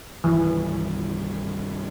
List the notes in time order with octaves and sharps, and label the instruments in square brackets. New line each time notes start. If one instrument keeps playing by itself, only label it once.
[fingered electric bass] C2 G2 D#3 [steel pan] E3